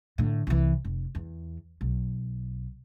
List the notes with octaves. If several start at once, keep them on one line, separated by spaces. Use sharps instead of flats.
A2 D3
C2 E3
F1
E2
B1